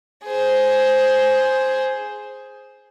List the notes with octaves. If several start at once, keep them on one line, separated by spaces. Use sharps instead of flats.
G#4 C5